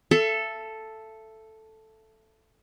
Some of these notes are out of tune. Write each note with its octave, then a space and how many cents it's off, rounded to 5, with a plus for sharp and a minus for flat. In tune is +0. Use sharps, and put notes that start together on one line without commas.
A4 +0 E5 +30